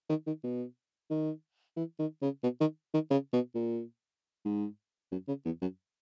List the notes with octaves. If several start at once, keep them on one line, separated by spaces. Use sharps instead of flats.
D#3
D#3
B2
D#3
E3
D#3
C#3
B2
D#3
D#3
C#3
B2
A#2
G#2
F#2
C#3
E2
F#2